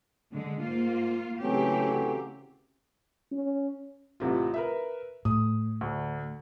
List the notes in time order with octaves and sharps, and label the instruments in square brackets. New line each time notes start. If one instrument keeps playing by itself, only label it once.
[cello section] D3 G#3
[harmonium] G#2 [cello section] A#3 F4
[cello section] C#3 C4 G4 [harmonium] E3 F#3 A3
[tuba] C#4
[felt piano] A1 C3 F4
A#4 B4 E5
[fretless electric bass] A2 [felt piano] D#6
[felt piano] D2